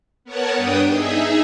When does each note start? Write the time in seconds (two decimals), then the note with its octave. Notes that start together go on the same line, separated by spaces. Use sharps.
0.24 B3 A#4 C#5 F#5 A5
0.54 G2 B3 D4 G5 D#6
0.88 D#4 G#4 E5